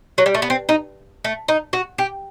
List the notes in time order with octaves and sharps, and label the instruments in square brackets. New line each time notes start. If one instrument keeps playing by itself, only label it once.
[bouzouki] F#3
G3
A3
B3
C4
D#4
A3
D#4
F#4
G4